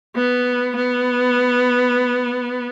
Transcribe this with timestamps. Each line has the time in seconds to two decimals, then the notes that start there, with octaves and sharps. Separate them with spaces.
0.16 B3
0.76 B3